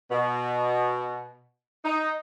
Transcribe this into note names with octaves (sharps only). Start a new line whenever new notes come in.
B2
D#4